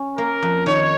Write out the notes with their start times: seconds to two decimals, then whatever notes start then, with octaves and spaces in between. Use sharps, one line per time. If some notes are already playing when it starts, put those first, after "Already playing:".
Already playing: C#4
0.18 A#3 A#4
0.42 F2
0.66 D#3 C#5